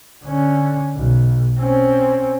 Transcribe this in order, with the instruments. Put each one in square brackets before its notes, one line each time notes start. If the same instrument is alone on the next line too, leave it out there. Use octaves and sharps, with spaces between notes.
[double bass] D3 C#4
B1
C4 C#4